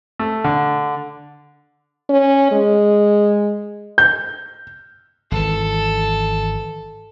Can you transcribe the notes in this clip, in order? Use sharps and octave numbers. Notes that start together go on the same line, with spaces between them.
A3
D3
C#4
G#3
G6
G#1 E3 A4